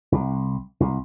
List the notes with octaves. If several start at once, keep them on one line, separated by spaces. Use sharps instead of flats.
C2
C2